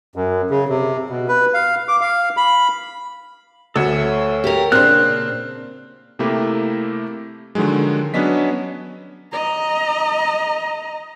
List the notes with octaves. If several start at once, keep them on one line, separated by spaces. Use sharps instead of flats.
F#2
C#3
C3
B2
B4
F5
D6
F5
B5
D2 A4 C#5 E5
G4 A#4
A#2 C#3 C4 D4 C5 F6 F#6
C3 A3 A#3 E4 G4
D3 D#3 F3 F#3 G#3
F#3 B3 C#4 D4 D#5 B6
D#5 A#5